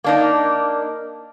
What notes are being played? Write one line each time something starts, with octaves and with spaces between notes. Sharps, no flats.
A#3 D4 D#4